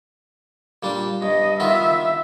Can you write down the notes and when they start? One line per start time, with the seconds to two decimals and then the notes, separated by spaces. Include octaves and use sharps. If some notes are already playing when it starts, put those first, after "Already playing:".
0.83 A#2 G3 D4
1.22 G2 D#5
1.60 D#3 B3 F4 E5